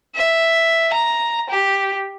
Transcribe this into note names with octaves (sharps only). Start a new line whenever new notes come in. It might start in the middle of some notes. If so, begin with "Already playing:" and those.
E5
A#5
G4